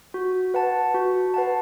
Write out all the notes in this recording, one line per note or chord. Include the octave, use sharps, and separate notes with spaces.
F#4
B4 F#5 A5
F#4
B4 F#5 A5